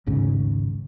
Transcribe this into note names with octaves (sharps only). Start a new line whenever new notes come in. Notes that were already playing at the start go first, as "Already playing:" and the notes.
A1 D#2 G#2 C#3